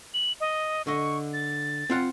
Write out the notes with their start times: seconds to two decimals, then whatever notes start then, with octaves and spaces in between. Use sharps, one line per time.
0.14 F#7
0.40 D#5
0.87 D3 D#5 C#6
1.33 A6
1.90 C4 F4 F#5